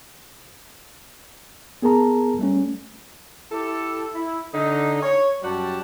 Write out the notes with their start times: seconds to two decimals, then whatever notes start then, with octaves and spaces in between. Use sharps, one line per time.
1.82 B3 G#4 A#4 A5 A#5
2.39 G3 A3 C#4
3.52 E4 G4 A4
4.13 E4
4.53 D3 D#4
5.02 C#5
5.42 F#2 G3 F#4 G4 A5